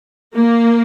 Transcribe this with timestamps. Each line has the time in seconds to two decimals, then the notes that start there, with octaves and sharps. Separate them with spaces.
0.35 A#3